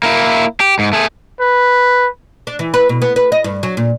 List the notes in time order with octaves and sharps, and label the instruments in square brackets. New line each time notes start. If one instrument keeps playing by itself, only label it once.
[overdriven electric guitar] A#3 E4
G4
G#2
A3 G#4
[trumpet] B4
[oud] D4
E3
B4
B2
B3
B4
D#5
G2
F#3
A#2